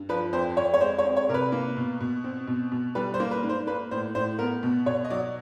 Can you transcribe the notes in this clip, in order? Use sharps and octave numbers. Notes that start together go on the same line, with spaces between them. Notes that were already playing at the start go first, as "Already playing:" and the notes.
Already playing: G2
F3 B4
F2 C5
F2 C#5
C#5
G#3 C5
C#5
C4
C#5
C3 A#4
B4
A#3
B2
B2
C4
B2
B2
G3 B4
C5
A#3
B4
G#2
C5
A#3 B4
A2 C5
A2 C5
B3 A#4
B2
B2 C#5
D#5
F#3 D5